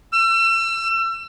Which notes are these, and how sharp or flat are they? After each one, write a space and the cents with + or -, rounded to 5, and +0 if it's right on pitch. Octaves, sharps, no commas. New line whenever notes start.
E6 +35